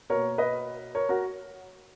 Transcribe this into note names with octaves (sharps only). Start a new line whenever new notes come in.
B2 A#3 A#4 C#5
B4 D#5
A#4 C#5
F#4 A#4